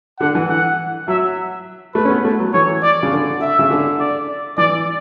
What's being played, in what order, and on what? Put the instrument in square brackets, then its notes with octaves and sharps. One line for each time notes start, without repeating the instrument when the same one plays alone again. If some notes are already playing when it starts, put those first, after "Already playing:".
[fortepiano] D3 [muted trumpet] F#5
[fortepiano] E3
[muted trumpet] F#5
[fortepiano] F#3 [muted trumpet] E5
[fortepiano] A3 [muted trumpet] B4
[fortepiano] C#4
B3
A3
F#3
[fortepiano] E3 [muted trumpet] C#5
[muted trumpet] D5
[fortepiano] C#3
D3
[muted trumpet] E5
[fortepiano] C#3
D3
[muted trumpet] D5
[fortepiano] E3 [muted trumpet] D5